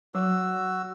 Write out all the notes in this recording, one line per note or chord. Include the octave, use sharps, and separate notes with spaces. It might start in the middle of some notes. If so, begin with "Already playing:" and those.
F#3 F#4 E6